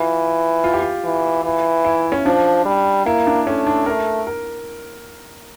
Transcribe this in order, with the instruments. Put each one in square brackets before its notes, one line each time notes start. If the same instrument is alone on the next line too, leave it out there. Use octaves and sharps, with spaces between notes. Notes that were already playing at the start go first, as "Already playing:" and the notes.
Already playing: [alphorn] E3 [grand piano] F4
[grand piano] F4
G4
F4
[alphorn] E3
E3
[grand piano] E4
C#4
[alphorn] F3 [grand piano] D4
[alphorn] G3
[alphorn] A#3 [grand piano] E4
[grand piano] D4
[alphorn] A3 [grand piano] C#4
[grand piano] D4
[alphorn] A3 [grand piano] A#4
[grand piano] A#4